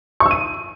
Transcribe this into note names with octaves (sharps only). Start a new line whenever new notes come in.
C#6
E6
D#7